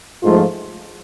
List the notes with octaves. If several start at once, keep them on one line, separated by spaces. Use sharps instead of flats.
G#2 F3 A3 F4